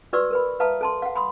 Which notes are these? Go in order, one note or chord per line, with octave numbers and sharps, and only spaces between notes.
F#4 B4 D5 C#6 D#6 E6
A#4 B4 B5
B4 E5 F5 A5 A#5 D#6
A4 A5 C6
F5 F#5
B5 C6 D#6